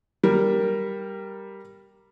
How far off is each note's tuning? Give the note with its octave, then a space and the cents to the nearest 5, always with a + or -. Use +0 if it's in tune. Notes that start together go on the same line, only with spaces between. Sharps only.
G3 +0 A#4 +0